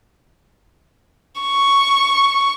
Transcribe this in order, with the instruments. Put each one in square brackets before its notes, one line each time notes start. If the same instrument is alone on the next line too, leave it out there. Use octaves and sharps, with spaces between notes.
[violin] C#6